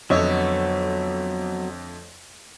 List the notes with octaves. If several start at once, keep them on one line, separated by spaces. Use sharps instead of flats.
F2 D3 F#3 A3 B3 C#5 D#5 E6